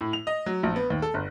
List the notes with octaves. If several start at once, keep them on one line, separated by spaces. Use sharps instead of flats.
A2
F7
D#5
F#3
A#1
B3
D#2
A4
G1